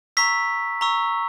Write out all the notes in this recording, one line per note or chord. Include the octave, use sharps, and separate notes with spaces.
A#5 C#6 E6 B6
A#5 C#6 E6